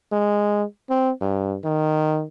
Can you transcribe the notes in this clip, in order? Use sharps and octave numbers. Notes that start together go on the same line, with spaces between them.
G#3
C4
G2
D#3